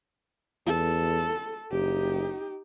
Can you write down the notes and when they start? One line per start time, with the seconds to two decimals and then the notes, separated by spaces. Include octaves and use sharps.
0.67 E2 A4
1.71 F#1 D#4 G4